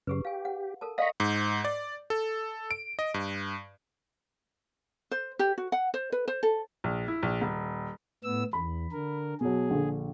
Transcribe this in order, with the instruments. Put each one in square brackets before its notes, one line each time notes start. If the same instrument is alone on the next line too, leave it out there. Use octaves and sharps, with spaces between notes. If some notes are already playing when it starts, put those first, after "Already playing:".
[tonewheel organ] F#2 C#3 [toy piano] G4 G#4 B4
[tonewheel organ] G4 [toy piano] F5 G#5
[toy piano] F#5
A4 A#4 A5
[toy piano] D5 F5 F#5 [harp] D#5 C#6 [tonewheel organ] A#5 B5
[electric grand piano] G#2
D5
A4
D7
D#5
G2
[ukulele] C5
G4
F#4
F#5
C5
B4
C5
A4
[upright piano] A#1
E4
A#1
D#1
[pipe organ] A2 B3 E6
[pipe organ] E2 [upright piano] B5
[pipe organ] D3 A#4
[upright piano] B2 F#3 [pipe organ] G#4
[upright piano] A#1 D3